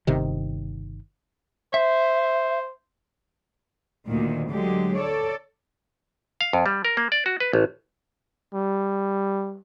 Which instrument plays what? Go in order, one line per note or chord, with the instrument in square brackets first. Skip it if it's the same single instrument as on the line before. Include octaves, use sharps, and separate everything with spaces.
[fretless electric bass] G1 C3 D#3
[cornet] C5 [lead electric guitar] E5
[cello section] D2 A#2 D#3
D3 F#3 G#3 G4
A4 C#5 D5
[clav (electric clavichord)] F5
F2
G3
A#4
A#3
D5
F#4
B4
A1
[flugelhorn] G3